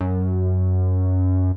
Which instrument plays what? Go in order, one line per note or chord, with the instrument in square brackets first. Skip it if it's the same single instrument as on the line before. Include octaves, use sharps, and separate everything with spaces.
[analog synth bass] F#2